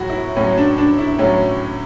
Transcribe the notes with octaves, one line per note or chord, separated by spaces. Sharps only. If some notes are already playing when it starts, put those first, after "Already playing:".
Already playing: A2 F#3 F#4
E4
A2 F#3 C#4
D4
D4
E4
A2 F#3 C#4